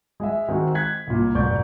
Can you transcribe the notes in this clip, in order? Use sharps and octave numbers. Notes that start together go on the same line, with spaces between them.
G#3 D#5 E5
D#3 G#3 C4 F#4
F#6 G#6 B6
C2 A#2
F1 B1 G#2 D5 C#6 G6